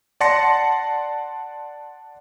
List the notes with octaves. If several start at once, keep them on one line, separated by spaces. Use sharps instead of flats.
D5 F#5 A5 C6 A#6 C#7